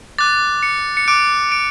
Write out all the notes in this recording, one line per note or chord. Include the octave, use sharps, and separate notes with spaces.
D6 F#6 A6
C#7
C#7
D6 F#6 D7
D7